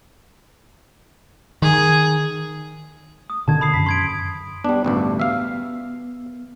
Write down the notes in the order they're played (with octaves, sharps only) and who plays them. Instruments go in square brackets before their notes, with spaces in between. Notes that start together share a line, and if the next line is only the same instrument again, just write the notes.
[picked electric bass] D#3 [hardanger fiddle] G#4
[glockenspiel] D#6
[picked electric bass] B2 D3 D#3 [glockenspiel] A5 G#6
[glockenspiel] B5 D#6 C7
[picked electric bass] F#2 [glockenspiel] B6
[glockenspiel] C6 G#6 D7
[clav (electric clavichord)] G3 D4 [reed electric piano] B3
[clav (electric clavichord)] A1 D2 G2
E5 F5